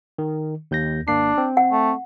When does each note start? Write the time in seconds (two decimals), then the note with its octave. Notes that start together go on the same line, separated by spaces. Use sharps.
0.18 D#3
0.71 D#2 G6 A#6
1.08 G#1 A#3 D4 C7
1.38 C4
1.57 F#5
1.72 A3